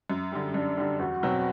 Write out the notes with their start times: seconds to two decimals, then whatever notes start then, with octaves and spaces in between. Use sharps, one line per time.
0.10 F#2
0.32 D3 G3
0.54 F#2 D4
0.77 D3 G3
0.99 E2 F#4
1.23 B2 F#3 C4